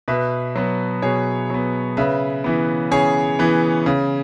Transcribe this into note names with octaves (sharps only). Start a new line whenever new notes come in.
B2 B4 E5
F#3 B3
B2 G#4 C#5
F#3 B3
C#3 B4 E5
E3 B3
C#3 G#4 C#5
E3 B3
C#3